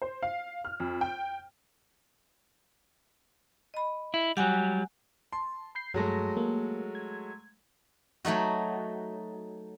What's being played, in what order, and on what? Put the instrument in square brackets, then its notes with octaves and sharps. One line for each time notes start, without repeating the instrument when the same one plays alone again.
[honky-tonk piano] C5
F5
F6
F2
G5
[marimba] D#5 B5
[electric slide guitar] E4
[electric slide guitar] F#3 G3 [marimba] F#5 G#5 F#6
[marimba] G#3
[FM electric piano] A5 [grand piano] C6
[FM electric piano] B5 G6 C7
[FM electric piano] G2 A#6 [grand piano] F#3 G#3 A3
[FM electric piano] A#3
G#6
[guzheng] F#3 A3 D#4 F#4